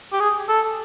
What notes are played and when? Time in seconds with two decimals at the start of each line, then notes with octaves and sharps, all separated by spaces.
0.13 G4
0.20 G#4
0.49 A4